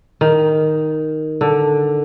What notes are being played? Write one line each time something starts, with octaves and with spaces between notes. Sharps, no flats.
D#3
D3